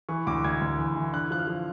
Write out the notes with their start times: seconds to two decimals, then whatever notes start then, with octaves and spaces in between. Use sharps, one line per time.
0.09 E3 C#6
0.27 D2 D6
0.44 D2 G#6
0.61 D2
0.78 E3
0.96 E3
1.13 D3 F#6
1.31 F3 F#6
1.39 F6
1.47 F3